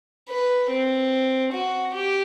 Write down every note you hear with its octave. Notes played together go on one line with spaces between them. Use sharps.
B4
C4
F#4
G4